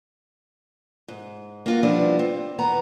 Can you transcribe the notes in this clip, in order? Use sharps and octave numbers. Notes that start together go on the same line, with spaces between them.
G#2
A#3 F4 F#4
F3 G3 B3 C4 D4 E4
C4
E2 B3 A#5